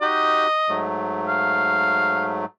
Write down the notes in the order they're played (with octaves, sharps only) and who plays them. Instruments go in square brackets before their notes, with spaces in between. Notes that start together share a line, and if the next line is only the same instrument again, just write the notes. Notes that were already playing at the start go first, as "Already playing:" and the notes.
[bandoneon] D#4 F#4 G4 [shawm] D#5
[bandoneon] G#2 F#3 A3
[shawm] F5